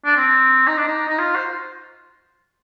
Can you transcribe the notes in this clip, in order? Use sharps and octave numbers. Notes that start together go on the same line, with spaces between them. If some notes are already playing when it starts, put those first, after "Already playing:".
D4
C4
D#4
D4
D#4
D#4
F4
C5